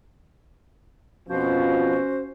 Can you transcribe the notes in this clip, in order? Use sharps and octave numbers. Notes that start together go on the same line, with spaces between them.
F2 B2 F3 C#4 F#4 C5